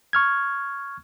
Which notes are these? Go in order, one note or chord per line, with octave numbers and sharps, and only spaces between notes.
C#6 F6 G#6